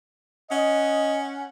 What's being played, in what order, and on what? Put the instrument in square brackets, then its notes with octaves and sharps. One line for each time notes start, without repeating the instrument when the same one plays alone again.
[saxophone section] C#4 F#5 [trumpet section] D#5